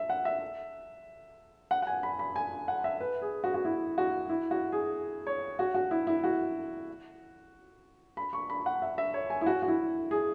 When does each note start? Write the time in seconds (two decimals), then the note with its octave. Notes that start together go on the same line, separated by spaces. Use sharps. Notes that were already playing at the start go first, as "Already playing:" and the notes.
Already playing: E5
0.10 F#5
0.25 E5
1.71 F#5
1.82 F#5
1.87 G#5
2.03 B5
2.19 B5
2.36 G#5
2.68 F#5
2.84 E5
3.00 B4
3.22 G#4
3.44 F#4
3.54 F#4
3.65 E4
3.98 F#4
4.29 E4
4.51 F#4
4.72 G#4
5.27 C#5
5.59 F#4
5.74 F#4
5.91 E4
6.07 E4
6.24 F#4
8.17 B5
8.33 C#6
8.50 B5
8.66 F#5
8.82 E5
8.98 E5
9.14 C#5
9.30 G#5
9.41 E4
9.46 F#4
9.62 F#4
9.68 E4
10.11 G#4